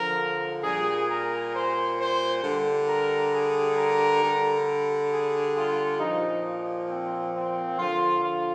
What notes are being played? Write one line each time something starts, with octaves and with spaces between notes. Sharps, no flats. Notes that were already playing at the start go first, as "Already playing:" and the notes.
Already playing: D3 F3 A#4
A#2 G3 G#4
A#4
C5
C5
D3 G3
A#4
G#4
A#4
D3 G3
G#4
F4
A#2 F3 D#4
C4
C4
D3 F3 F4
F4